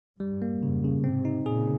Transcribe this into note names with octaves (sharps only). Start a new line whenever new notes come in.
G2 G3
A#3
F2 G#2 C#3
C#3
G#2 C3 C4
D#4
A#2 C#3 G#4